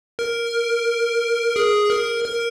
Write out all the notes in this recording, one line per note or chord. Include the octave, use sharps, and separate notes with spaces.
A#4
G#4
A#4
A#4